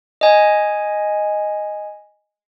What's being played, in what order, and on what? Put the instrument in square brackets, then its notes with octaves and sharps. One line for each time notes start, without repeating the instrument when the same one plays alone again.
[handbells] D#5 G#5